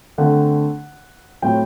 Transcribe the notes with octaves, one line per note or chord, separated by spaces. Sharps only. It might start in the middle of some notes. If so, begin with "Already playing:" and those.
D3 A3 C4 F#5
A2 F#3 C4 G5